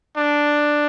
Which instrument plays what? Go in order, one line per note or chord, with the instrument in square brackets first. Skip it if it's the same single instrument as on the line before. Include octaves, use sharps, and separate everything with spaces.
[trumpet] D4